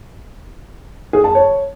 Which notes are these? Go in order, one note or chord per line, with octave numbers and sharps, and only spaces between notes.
G#4
A5
C#5